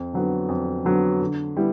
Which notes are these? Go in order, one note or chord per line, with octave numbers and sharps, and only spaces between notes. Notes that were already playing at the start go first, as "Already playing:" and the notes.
Already playing: F2
D3 F#3 B3
F2
D3 F#3 B3
D3
G3 B3 E4